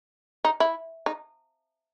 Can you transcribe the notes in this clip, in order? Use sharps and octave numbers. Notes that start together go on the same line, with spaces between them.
D#4
E4
D#4